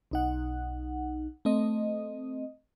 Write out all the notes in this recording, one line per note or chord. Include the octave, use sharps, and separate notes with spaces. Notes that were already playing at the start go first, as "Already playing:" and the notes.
B1 D#4 F#5
A3 C4 D#5